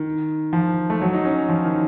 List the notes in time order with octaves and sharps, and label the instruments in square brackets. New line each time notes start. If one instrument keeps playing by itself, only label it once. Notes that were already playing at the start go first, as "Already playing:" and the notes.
Already playing: [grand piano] D#3
F3
A3
F#3
D#4
C#4
F3
D#3